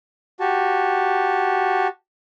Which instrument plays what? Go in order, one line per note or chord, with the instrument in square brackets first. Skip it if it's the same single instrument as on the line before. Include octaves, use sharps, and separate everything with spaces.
[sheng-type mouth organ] F#4 G4 A5